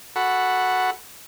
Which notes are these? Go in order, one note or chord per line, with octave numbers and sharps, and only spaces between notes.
F#4 A4 F#5 B5